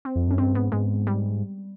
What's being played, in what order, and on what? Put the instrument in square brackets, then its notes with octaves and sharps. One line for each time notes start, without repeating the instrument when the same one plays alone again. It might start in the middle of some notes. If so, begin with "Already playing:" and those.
[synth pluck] C4
[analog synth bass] F2
[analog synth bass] F#2 [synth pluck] C#4
[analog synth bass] G2 [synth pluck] C4
[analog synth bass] G#2 [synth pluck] B3
[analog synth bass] G#2 [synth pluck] G#3
[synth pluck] G3